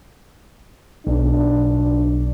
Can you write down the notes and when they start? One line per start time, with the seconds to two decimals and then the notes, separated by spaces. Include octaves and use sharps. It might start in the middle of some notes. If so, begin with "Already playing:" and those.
1.07 B1 D4